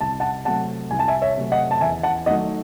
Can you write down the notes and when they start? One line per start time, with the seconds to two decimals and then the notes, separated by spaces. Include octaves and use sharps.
0.01 C2 A5
0.20 F#5 A5
0.45 C3 F#3 A3 F#5 A5
0.91 C2 G#5
0.99 A5
1.08 E5 G#5
1.22 C#5 E5
1.37 C3 F#3 A3
1.52 D#5 F#5
1.71 A5
1.81 E2 E5 G#5
2.03 F#5 A5
2.26 D#3 F#3 A3 D#5 F#5